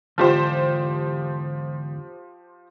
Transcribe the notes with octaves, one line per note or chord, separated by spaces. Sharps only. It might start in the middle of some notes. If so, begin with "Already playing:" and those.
E2 G#2 D3 F3 G4 C5